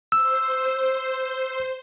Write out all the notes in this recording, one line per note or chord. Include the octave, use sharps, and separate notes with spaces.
C5 E6